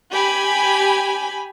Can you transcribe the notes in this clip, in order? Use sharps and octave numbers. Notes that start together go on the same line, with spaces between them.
G4 G#5 B5